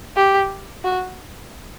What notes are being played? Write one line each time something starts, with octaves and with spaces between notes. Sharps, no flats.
G4
F#4